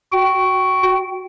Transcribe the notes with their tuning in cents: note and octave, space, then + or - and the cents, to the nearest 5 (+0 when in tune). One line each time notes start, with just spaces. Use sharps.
F#4 +0 G5 -25